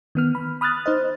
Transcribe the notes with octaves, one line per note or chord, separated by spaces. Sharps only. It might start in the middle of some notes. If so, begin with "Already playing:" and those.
D#3 B3 F6
B5
B5 D#6 F6 F#6 A6
D#4 C5 D#5